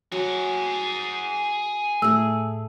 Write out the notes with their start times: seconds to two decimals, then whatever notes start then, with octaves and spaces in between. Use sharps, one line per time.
0.12 F#3 G#4 F#5
2.02 A2 A3 G#4 E6